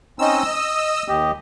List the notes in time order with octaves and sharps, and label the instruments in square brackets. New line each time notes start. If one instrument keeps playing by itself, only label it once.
[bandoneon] C4 C#4 D#4 [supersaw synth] D#5 E6
[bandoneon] D#6
D#2 G4 D#5